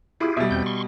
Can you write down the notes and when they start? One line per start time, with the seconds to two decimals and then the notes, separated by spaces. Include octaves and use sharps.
0.20 E4 F4 G4 G#4
0.37 B2 G3 E5
0.51 E2 C4 G6
0.66 C6 C#6